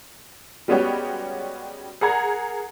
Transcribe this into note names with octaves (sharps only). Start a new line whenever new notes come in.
G3 G#3 B3 C#4 F#4 G4
G#4 A#4 F#5 A#5 G#6